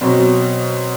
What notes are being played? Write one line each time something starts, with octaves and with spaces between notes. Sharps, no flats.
B2 F#3 C4